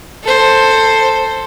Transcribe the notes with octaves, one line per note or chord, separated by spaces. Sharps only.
A4 C5